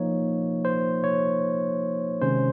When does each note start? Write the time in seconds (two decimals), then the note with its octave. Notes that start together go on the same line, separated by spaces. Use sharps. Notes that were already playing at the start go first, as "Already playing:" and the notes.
Already playing: F3 A#3 D#4 C#5
0.65 C5
1.04 C#5
2.21 C3 D#3 G#3 C#4 C5